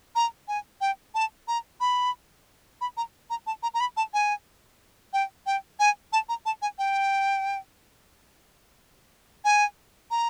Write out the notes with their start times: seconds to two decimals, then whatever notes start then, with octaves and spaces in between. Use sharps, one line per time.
0.15 A#5
0.48 G#5
0.81 G5
1.14 A5
1.48 A#5
1.80 B5
2.81 B5
2.97 A#5
3.30 A#5
3.47 A5
3.63 A#5
3.74 A#5
3.80 B5
3.97 A5
4.14 G#5
5.13 G5
5.46 G5
5.79 G#5
6.13 A5
6.29 A#5
6.46 A5
6.62 G#5
6.78 G5
9.45 G#5
10.11 A#5